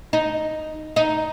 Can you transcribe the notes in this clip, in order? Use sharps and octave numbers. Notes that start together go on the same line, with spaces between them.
D#4
D#4